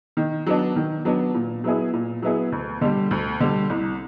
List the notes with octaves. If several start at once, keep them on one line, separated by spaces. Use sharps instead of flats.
D#3
F#3 B3 D4
D#3
F#3 B3 D4
A#2
F#3 B3 E4 G#4
A#2
F#3 B3 E4 G#4
D2
D3 G3
D2
D3 G3
C2